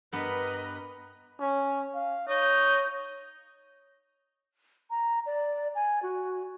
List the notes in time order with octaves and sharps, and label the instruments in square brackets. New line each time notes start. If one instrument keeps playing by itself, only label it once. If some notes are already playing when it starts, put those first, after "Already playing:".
[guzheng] G2 B3 [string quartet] A#4 D#5 B5 [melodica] B4
[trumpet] C#4
F5
[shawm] D#4 [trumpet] C#5
[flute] A#5
D5
G#5
F#4